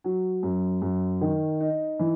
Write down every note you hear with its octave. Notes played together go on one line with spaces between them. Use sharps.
F#3
F#2
F#2
D#3
D#4
E3